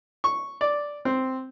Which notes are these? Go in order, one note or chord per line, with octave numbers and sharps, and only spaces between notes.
C#6
D5
C4